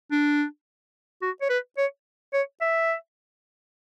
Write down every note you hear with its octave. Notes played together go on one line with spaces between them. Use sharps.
D4
F#4
C#5
B4
C#5
C#5
E5